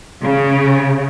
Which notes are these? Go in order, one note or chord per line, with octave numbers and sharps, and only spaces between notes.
C#3